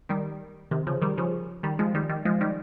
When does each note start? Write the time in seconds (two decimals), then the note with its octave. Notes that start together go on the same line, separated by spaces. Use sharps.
0.09 D#3 G3
0.71 C3 D#3
0.87 C#3 F3
1.01 D#3 G3
1.18 C#3 F3
1.63 D#3 G3
1.79 F3 G#3
1.94 D#3 G3
2.09 D#3 G3
2.25 F3 G#3
2.41 D#3 G3